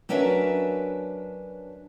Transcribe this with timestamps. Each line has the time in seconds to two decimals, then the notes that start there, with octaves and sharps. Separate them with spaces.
0.09 F#3 C#4 D4 A#4 B4 E5